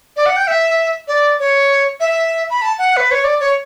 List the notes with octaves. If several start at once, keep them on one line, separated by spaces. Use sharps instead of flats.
D5
F#5
G5
E5
D5
C#5
E5
B5
A5
F#5
B4
C#5
D5
C#5